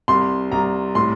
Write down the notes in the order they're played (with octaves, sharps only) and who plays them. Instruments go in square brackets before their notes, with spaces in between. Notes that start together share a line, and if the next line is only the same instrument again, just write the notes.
[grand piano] C2 C6
C2 A#5
A2 C6